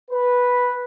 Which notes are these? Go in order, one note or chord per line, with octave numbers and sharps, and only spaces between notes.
B4